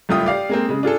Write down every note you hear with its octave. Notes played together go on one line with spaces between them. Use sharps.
F#1 G2 A3 F4 G5 D#6
G4 D5 F5 D6
G#3 A#3 C4
C#3 G#3
D4 F4 G#4 A4